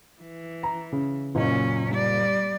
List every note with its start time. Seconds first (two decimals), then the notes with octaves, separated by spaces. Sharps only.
0.21 E3
0.63 A#5
0.92 C#3
1.35 F#1 A#2 F#3 C#4 D#5
1.90 G3 D5